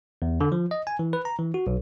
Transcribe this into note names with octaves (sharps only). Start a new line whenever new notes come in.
E2
D3
F3
D#5
G#5
E3
B4
A#5
E3
F#4
B1